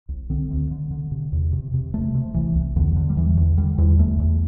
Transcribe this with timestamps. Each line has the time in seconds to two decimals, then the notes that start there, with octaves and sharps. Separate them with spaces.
0.09 C2
0.30 D3 C4
0.50 D2
0.71 D3
0.91 D3
1.12 C3
1.32 E2
1.53 C3
1.74 C3
1.94 C3 A3
2.15 C3
2.34 C2 E3
2.55 C2
2.76 E2 D3
2.96 D3
3.10 G3
3.17 E2 E3
3.37 E2
3.57 D3 G3
3.78 E2
3.99 E2 A3
4.20 E2